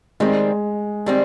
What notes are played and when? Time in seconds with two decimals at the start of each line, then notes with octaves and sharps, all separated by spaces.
0.20 D#3 G3 G#3 C4
1.06 D#3 G3 C4